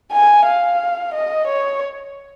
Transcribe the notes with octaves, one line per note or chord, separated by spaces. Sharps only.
G#5
F5
D#5
C#5